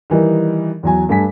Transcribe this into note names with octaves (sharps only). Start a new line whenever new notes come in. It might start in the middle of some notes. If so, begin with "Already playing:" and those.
D#3 E3 G3 D#4
E2 F#3 G#5
G2 A3 G#5 B6